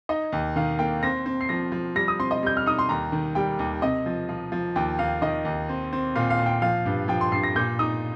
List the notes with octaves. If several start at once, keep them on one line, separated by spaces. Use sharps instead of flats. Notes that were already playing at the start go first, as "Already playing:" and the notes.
D#4 D#5
D#2
D#3 F5
A#3 G5
C4 A#6
C4
C7
F3 A#6
F3
G3 A#6
D#6
C4 C6
D#5
G3 G6
F6
D#4 D#6
C6
D#2 A#5
D#3
G3 G5
D#2
C3 D#5
F3
F3
F3
D#2 G5
D#2 F5
D#3 D#5
D#2
C4
C4
A#2 F5
F5
A#2
G5
F3 F5
G2
F3 G5
C6
G2 C7
A#6
A#2 G6
D#4 D#6